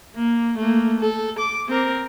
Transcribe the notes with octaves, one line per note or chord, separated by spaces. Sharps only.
A#3
A3 A#3
A4
D6
C4 A#4